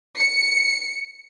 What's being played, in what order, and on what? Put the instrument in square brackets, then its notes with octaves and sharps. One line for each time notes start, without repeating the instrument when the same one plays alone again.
[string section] C#7